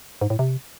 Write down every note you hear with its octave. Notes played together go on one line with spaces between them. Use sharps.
G#2
A2
C3